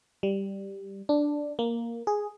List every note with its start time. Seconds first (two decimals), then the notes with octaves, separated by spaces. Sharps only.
0.23 G3
1.09 D4
1.59 A#3
2.07 G#4